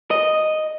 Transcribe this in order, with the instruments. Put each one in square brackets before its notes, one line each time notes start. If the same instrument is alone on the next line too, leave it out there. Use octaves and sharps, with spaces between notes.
[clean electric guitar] D#5